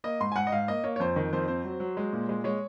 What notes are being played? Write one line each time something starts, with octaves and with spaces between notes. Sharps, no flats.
A#3 D#5
G#2 C6
G#5
G#2 F#5
D#5
G#2 F5
A#3 D#5
A#3 C#5
C#5
F2 C5
D#3
F2 C5
C4 C5
F#3
F#3
G#3
A#2
G#3
G#3 C#5